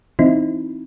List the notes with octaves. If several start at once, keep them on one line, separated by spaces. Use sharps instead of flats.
E3 C4 D#4 E4